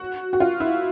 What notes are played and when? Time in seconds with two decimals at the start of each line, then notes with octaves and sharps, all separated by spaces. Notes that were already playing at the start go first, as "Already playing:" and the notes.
Already playing: F#4
0.33 F#4
0.40 F4
0.60 E4